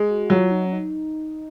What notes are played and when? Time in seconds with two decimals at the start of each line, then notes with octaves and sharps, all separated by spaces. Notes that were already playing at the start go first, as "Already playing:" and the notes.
Already playing: G#3
0.09 F#4
0.30 F#3 F4
0.51 D#4
0.65 C#4
0.73 D#4